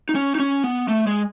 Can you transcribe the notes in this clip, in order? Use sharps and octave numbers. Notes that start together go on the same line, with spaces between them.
D#4
C#4
D#4
C#4
B3
A3
G#3